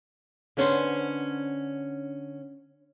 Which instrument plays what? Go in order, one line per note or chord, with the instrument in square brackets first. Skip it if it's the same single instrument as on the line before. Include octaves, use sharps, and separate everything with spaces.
[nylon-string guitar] D3 B3 C#4 D4 B4 C5